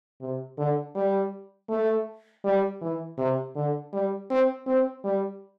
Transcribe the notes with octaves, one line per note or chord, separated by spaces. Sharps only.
C3
D3
G3
A3
G3
E3
C3
D3
G3
C4
C4
G3